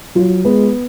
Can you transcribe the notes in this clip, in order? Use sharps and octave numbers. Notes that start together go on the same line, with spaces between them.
F#3 F4
G#3 B3